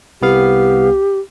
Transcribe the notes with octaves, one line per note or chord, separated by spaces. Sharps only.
C2 B3 G4 F5